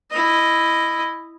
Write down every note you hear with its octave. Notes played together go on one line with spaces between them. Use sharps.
E4 D#5